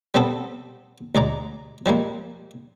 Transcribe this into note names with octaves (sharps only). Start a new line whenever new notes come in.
G3 B3 C4 A4
D2 G#3 D5 A#5
F3 G3 G#3 A#3